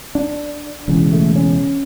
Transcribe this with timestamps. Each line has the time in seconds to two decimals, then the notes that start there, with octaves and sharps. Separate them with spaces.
0.15 D4
0.88 E1 E2 C#3
1.12 A3
1.36 C#4